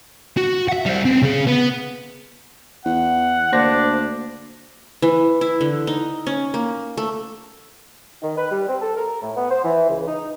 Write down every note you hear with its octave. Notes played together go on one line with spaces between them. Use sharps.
F#4
E5 F#5
G3 C5
B3 C4
C#3 G#4
B3
E2 F#5
D2 A#3 D4 C5 A#6
E3
E4
D3
D#4
C#4
A#3
A3
D#3
B4
G3
C4
A4
A#4
A2
B3
C5
E3
C#2
D#4